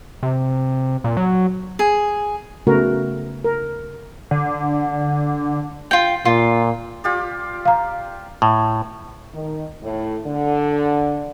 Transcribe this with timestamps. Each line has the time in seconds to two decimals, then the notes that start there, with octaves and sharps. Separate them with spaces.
0.23 C3
1.04 A#2
1.17 F#3
1.79 G#4
2.67 C#3 A3 B3 F#4 A#4
3.44 A#4
4.31 D3
5.91 F4 G5
6.25 A#2 F4
7.04 F4 G4 D5
7.65 F5 A#5
8.42 A2
9.34 D#3
9.83 A2
10.26 D3